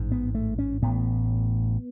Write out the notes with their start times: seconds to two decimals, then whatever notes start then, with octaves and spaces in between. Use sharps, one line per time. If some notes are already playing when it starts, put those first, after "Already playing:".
Already playing: A1 G#2
0.12 B3
0.35 A3
0.59 C#4
0.82 A1 A2 B3